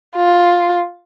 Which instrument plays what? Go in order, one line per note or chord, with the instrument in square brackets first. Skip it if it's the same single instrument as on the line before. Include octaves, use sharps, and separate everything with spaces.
[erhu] F4